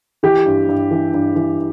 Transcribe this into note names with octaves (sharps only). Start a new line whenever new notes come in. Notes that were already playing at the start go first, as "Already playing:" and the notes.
E3 G4
G2
G2
E3
G2
E3